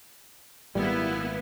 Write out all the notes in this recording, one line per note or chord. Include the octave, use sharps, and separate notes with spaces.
G#1 A#2 G3 B3 E4